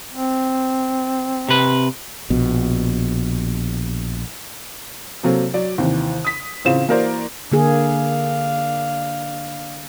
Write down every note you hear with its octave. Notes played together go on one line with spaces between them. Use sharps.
C4
C3 B4
A#1 B2
C3 F#3 A#3 C4 A4
F#3 D5
D#2 C3 E3
D#6 B6
A1 C#3 C4 F4 E7
E3 A#3 F#4 A#4 C5 D5
D3 A#3 D4 G#4 F5